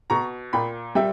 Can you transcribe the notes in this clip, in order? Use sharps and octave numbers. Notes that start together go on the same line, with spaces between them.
B2 A#5 C#6
A#2 G5 B5
G3 E5 G5